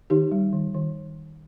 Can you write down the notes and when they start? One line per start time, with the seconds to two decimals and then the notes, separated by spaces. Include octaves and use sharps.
0.10 D#3 D#4 G4
0.32 G3
0.53 D#3
0.74 D#3